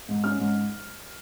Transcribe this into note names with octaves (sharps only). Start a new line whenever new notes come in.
G#2
C#4 F6
G#2